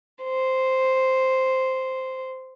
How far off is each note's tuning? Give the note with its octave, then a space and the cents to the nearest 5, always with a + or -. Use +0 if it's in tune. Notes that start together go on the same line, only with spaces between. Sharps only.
C5 -5